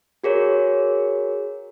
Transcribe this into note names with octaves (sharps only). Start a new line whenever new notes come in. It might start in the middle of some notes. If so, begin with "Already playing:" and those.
F#4 G#4 A#4 C#5